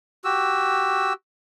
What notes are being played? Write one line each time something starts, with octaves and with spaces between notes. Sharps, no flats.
F#4 G4 E6